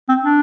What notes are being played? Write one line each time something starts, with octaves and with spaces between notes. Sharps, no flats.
C4
D4